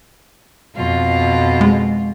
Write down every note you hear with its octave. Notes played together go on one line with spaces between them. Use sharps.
F2 B2 F4
G#3